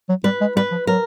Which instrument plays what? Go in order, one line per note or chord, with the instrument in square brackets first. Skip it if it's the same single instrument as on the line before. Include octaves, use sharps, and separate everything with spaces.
[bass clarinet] F#3
[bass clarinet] G3 [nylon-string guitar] B4
[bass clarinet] G#3
[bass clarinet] G3 [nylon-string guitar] B4
[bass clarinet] F3
[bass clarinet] F#3 [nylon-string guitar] A#4